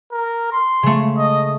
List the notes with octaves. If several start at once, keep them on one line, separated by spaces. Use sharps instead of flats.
A#4
C6
C#3 A3
D#5